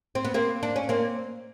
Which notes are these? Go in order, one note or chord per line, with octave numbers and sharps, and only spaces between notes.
C4
B3
A#3 C4
D4
C#4
A#3 C4